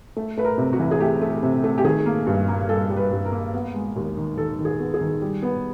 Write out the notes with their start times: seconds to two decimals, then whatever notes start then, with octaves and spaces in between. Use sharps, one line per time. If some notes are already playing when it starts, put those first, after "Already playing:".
0.17 A3
0.38 A3 B4
0.45 A#4
0.58 C3
0.73 F#4
0.79 E3
0.91 G#4
1.00 A3 G4
1.21 A3
1.43 C3
1.64 A3
1.78 G4
1.84 D#3 G#4
2.06 A#3
2.27 G2
2.48 A#3
2.69 G3 A4
2.90 G3
2.96 B4
3.12 G2
3.25 A#4
3.32 A#3
3.54 B3
3.74 G#3
3.96 D#2
4.17 D#3
4.37 D#3 A4
4.59 D#3
4.65 G#4
4.79 B3
4.94 G#4
5.01 D#3
5.21 G3
5.42 B3